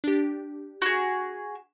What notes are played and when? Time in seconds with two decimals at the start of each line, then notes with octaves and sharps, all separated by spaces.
0.04 D4 G4
0.82 F#4 G#4